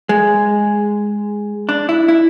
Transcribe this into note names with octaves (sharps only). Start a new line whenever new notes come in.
G#3
D4
E4
E4